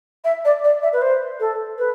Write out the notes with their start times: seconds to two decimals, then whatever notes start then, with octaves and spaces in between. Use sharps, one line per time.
0.25 E5
0.45 D5
0.64 D5
0.83 E5
0.93 B4
1.02 C5
1.40 A4
1.78 B4